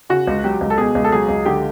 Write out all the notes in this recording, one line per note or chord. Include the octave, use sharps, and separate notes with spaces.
C#3 F#4
C#2
F#3 G4
C#2
A4
B2 G#4
C#2
A4
F#3 G#4
C#2
D3 G4